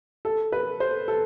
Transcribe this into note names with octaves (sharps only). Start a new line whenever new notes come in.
A4
B4
C5
A4